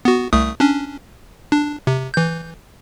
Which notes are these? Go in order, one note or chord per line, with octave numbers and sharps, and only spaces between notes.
B3 F#4
C2 A3 D#6
C#4 D4
D4
C3
E3 G6